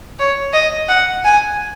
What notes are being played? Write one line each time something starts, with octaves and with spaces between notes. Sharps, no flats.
C#5
D#5
F#5
G#5